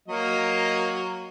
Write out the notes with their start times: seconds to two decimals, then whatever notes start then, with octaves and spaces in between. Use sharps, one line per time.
0.08 F#3 A#3 D#5